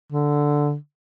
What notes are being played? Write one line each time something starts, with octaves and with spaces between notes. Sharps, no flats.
D3